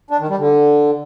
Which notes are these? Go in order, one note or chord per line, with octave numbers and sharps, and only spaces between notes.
D4
D#3
G3
D3